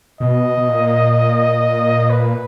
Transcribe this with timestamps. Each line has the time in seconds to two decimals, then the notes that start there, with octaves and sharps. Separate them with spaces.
0.20 B2 D#5
0.58 B2
0.67 A#2
2.10 B4